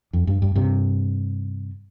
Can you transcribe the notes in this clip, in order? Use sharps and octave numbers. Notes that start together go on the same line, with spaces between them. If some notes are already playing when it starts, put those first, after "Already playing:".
F2
G2
G2
G2 C3